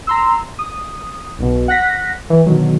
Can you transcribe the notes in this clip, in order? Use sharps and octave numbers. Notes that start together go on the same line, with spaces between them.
A#5 C6 E6
D#6
B1 B2
F#5 F#6 A#6 B6
E3
B2 D3 D#3 F#3